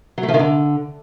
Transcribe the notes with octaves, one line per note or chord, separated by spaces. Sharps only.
F#3
A3
F3
D#3
D3